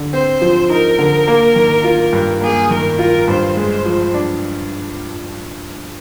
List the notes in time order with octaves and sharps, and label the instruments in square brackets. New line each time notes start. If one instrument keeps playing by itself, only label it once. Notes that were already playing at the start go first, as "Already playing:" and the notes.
Already playing: [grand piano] D3
[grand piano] C4 [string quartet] C5
[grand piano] F3
[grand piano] D#4 [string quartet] A#4
[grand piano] D3
A#3
D#3
F4
G2
[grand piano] A#3 [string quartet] G#4
[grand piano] D#3 [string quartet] A#4
[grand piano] F4 [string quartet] A#4
[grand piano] G2 [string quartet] C5
[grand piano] G#3 [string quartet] C5
[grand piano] F3
D4